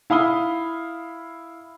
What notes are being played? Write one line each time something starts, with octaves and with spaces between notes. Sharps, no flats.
E4 F5 B5 D#6 G7